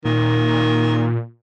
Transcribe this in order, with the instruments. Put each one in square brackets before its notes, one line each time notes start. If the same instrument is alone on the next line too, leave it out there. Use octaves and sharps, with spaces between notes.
[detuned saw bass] A#2 [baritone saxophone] D#3